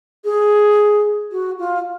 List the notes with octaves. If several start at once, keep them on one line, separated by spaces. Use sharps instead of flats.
G#4
F#4
F4